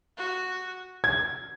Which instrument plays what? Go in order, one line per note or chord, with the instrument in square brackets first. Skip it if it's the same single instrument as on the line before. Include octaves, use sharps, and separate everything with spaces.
[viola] F#4
[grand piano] G#6